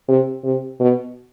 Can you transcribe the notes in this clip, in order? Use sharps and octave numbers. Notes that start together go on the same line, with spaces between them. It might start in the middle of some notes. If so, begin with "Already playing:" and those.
C3
C3
B2